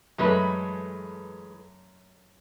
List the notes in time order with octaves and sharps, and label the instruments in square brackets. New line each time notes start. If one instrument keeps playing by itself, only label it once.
[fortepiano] F#2 A3 [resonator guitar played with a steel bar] E3 G#3 B4